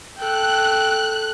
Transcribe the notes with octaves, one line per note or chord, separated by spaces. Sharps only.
A4 G5 F#6